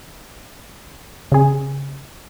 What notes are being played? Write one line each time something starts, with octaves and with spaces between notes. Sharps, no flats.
C#3 G#4